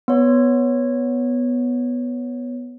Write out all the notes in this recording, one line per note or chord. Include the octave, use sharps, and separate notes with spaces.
B3 C#5